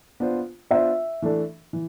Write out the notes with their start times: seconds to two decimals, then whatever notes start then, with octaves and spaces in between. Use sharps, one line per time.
0.20 B3 D4 F4 C5
0.70 B3 D4 F4 C5 E5
1.22 E3 A3 D4 A4
1.73 E3